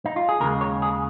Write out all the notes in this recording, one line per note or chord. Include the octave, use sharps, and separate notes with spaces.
D#4
F4
G#4
D#2 C#3 G#3 A#4
C#5
G#4